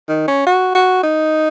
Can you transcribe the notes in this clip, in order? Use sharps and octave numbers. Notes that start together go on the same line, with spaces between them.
D#3
C#4
F#4
F#4
D#4